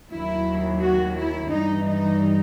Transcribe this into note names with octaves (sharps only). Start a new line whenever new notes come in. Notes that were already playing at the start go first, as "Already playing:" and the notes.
D#2 D#3 F#3 E4
F#4
E4
G2 E3 G3 D#4
D#4